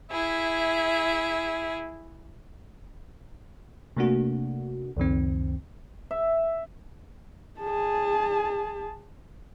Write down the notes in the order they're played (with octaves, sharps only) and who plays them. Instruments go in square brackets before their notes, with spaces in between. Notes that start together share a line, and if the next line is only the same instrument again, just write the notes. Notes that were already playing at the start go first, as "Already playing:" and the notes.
[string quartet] E4 G#4 E5
[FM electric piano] C3 A3 A#3 D4 F#4
C#2 F#2 D#3 C4
[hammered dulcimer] E5
[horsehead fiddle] G#4 A5